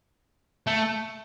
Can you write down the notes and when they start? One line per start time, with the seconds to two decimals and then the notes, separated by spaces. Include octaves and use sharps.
0.67 A3